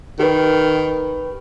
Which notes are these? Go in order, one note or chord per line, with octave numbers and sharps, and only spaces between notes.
D#3 G4 B4